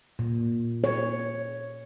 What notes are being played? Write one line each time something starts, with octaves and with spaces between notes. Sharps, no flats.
A#2
C#5